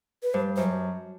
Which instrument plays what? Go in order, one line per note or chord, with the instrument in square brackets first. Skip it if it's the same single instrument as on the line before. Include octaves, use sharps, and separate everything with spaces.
[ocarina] B4
[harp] G2 [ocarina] C5
[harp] F#2 [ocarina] C5